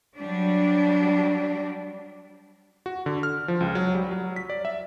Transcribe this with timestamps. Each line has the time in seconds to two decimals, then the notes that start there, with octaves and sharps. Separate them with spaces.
0.17 F#3 G3 D4
2.86 F#4
3.06 D3
3.23 F6
3.48 F3
3.60 C#2
3.75 F#3
3.95 G3
4.11 F#3
4.36 B6
4.50 D5
4.65 E5